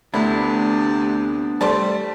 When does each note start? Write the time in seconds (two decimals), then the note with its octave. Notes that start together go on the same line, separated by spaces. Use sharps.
0.14 D2 C3 B3 D4 E4
1.61 G3 A3 C5 D5 A5